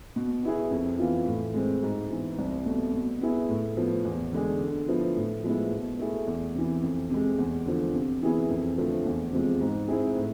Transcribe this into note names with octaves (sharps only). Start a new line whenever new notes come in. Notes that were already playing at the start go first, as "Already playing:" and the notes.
B2
B3 E4 G#4
F2
E3 B3 F4
A2
G#3 C4
G#2
E3 B3
C2
B2 A3
B2
B3 E4 G#4
A2
F3 B3
E2
D3 G#3 D4 G#4
D3
F3 B3 E4
A2
F3 G#3 B3 E4
B2
A3 E4 G#4
E2
C3 E3
F2
C3 G#3
E2
D3 F3
C3
E3 B3 E4 G#4
F2
D3 F3 A3
E2
C3 F3 G#3
G#2
G#3 C4 E4 G#4
A2